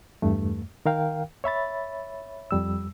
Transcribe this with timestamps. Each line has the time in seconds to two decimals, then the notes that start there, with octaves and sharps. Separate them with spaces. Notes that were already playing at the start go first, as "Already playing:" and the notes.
0.22 E2 G2 A3
0.86 D#3 A#4 F5 G5
1.44 C#5 E5 B5 A6
2.51 F2 G3 E6